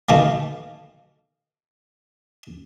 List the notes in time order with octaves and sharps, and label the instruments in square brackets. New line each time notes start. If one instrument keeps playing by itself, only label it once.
[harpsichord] B2 D#3 A3 A#3